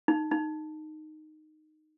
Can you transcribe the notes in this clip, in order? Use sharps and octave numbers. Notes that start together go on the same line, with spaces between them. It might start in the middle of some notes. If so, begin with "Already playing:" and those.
D#4
D#4